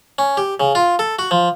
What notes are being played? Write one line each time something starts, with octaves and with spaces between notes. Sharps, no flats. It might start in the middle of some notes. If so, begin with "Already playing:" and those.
C#4
G4
C#3
F4
A4
F#4
F3